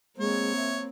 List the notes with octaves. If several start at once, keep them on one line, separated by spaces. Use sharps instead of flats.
G#3 A#3 C4 C#5
E5